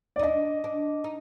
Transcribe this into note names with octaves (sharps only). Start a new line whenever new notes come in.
D5
D#4
D4 D#5
D4
D#4